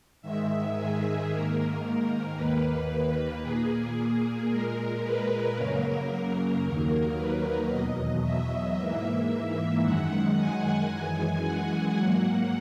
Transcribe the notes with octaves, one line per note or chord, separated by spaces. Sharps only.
G#2 D#3 G#3 E5
G#4
G#2 D#3 A#3 A#4
A#4
D#2 D#3 A#3 B4
A#2 A#3 G#4
A#2 G#3 A#4
B4
F#2 C#3 F#3 A#3 A#4
D#2 D#3 F#3 A#3
B4
E2 B2 F#3 D#5
E5
G#2 E3 A#3
F#2 D#3 G#3 F#5
G#5
F#2 E3 G#3
F#5
G#2 F#3 A#3